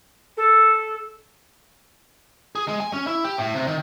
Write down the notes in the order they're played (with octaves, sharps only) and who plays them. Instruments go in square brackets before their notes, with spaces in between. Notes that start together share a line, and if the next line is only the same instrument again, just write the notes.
[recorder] A4
[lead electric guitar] G#4
G#3
G#5
C#4
E4
G4
A2
C3
D#3